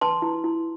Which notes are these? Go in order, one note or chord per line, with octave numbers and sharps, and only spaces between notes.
B4 A5 C6
E4
E4